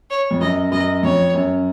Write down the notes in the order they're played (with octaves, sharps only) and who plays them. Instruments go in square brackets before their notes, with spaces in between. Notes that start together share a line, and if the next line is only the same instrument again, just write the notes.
[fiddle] C#5
[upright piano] F2
[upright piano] F#2 [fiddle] D#5
[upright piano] F#2 [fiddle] D#5
[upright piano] F2 [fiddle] C#5
[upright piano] F#2